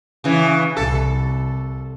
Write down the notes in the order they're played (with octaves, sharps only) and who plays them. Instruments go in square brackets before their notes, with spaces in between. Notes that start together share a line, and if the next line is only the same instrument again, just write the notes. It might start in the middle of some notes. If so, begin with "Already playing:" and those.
[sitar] C#3 E3
[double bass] C2 [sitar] A4